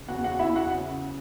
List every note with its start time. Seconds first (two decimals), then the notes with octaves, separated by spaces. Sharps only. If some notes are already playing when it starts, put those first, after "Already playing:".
Already playing: C#3
0.08 E2 F#4 F#5
0.24 F#4 F#5
0.39 E2 E4 E5
0.56 F#4 F#5
0.71 C#3